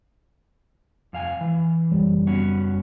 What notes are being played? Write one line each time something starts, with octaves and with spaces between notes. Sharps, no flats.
F2 F5 G#5
E3
F#1 C#2 G3
B3 C#4 F#4